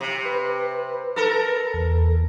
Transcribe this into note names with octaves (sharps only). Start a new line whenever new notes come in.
C3
B4
A4 A#4
E2